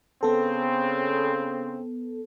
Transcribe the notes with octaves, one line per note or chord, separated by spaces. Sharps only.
C#3 B3 C4 A4